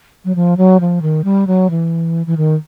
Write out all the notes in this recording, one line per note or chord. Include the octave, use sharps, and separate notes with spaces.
F#3
F3
F#3
F3
D#3
G3
F#3
E3
E3
D#3